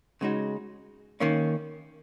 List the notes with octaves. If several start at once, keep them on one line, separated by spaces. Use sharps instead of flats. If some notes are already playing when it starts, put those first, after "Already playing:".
C#3 G#3 D#4 F#4
D#3 A#3 C#4